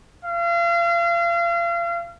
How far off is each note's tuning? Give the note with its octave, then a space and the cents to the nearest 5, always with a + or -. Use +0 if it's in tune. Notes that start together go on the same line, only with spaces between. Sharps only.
F5 -35